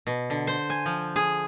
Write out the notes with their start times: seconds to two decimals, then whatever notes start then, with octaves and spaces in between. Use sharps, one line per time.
0.07 B2
0.30 D3
0.47 C5
0.70 G#5
0.86 F3
1.16 G#4